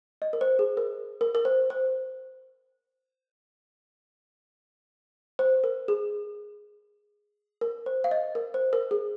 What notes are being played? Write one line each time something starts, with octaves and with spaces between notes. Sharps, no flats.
D#5
A#4
C5
G#4
A#4
A#4
A#4
C5
C5
C5
A#4
G#4
A#4
C5
F5
D#5
A#4
C5
A#4
G#4